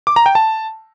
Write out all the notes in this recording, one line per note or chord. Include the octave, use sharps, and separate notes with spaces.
D6
A#5
G5
A5